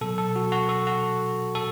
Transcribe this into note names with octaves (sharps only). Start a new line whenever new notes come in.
B2 F#3 A4
A4
F#4
F#4
A4
F#4
A4